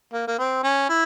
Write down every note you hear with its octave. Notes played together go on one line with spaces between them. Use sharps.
A#3
A#3
C4
C#4
E4